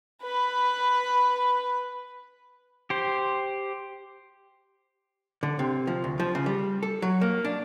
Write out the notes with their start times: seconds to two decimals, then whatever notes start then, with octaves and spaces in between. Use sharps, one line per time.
0.23 B4 B5
2.90 G4 C5
5.43 D3
5.59 C3
5.87 F3
6.04 D2
6.20 F3
6.35 C#3
6.46 G3
6.83 A4
7.02 F#3
7.21 A#3
7.45 D4